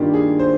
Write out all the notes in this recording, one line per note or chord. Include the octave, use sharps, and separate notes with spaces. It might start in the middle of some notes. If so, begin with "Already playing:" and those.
Already playing: G2 D#3 A#3 D4 F4 G4
G#4
C5